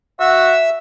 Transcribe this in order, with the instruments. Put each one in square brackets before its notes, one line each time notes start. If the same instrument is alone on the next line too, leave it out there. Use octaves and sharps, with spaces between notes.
[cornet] F#4 [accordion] E5 E6